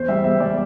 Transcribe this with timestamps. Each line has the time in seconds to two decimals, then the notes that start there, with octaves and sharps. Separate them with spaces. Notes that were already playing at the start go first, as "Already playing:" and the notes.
Already playing: E2 C5
0.08 G3 E5
0.24 E2 E5
0.40 G3 D5